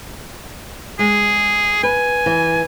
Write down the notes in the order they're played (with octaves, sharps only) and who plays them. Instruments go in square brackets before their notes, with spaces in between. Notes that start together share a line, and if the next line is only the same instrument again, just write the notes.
[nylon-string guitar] G#3 [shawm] G#4
[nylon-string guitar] B4 [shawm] G#5
[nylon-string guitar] E3